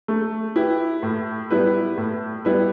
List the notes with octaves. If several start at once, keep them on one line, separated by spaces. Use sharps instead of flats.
A3
E4 G4 B4
A2
G3 B3 E4 B4
A2
G3 B3 E4 B4